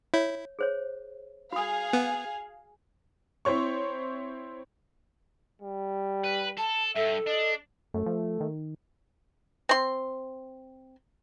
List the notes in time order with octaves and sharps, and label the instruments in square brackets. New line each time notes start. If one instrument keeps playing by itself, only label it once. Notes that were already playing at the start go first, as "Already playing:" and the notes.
[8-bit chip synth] E4 [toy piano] C#5
[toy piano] G#4 C5 C#5
[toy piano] F#4 D#6 [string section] G#4 F5
[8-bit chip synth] B3
[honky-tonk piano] C4 E4 C5 C#5 C#6
[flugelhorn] G3
[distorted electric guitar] B4
[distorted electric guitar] A4 [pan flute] A5
[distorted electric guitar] G2 [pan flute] A4 [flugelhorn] E5
[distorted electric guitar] D4 [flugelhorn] D#5
[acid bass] F#2 [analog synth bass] A3
[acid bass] F3
D#3
[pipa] C4 C6